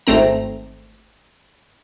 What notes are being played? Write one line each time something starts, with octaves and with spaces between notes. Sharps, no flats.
G#1 A3 C4 A#5